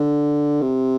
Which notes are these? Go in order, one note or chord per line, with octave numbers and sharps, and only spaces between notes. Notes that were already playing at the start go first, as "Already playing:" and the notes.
Already playing: D3
C3